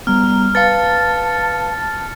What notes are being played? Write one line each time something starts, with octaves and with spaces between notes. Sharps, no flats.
G3 B3 A#5 F6
B4 F5 A5 A6 C#7